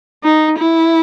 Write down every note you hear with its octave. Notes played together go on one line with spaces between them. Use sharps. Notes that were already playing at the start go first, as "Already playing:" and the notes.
D#4
E4